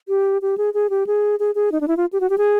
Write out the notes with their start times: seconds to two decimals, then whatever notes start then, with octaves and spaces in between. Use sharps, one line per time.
0.08 G4
0.42 G4
0.58 G#4
0.74 G#4
0.90 G4
1.07 G#4
1.40 G#4
1.55 G#4
1.72 D#4
1.81 D4
1.88 E4
1.97 F4
2.13 G4
2.20 F#4
2.30 G4
2.38 G#4